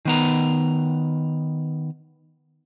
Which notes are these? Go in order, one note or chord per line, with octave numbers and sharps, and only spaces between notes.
D#3 B3 A#5